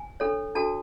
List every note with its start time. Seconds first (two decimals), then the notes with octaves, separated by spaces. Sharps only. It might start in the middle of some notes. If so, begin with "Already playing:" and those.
Already playing: G#5
0.20 D4 A4 C#5
0.55 D4 F#4 A4 A5